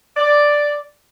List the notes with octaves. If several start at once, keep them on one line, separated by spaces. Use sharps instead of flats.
D5